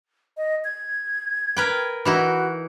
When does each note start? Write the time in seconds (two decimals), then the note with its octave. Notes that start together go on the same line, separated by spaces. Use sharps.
0.37 D#5
0.64 G#6
1.57 A#4 B4 G5
2.05 E3 D#4 E4 F#4